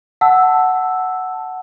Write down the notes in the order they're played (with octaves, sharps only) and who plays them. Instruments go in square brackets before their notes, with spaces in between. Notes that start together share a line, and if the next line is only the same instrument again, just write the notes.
[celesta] F#5 A5 E6